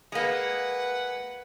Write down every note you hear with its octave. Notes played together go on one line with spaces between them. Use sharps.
G#3 A#3 B4 F#5